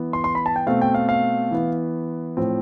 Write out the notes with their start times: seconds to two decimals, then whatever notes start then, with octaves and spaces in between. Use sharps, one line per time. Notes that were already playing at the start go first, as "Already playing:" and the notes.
Already playing: E3 B3
0.13 C6
0.24 C6
0.35 B5
0.46 A5
0.56 G5
0.67 B2 A3 C4 F5
0.82 G5
0.94 F5
1.09 F5
1.51 E3 B3
2.37 A2 F3 C4